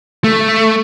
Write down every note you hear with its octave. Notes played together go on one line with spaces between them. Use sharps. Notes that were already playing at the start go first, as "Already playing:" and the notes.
A3